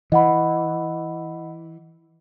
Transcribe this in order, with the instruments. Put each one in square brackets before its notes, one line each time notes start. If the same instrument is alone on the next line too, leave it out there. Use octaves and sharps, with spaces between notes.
[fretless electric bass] E3 [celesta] D#5 F#5 B5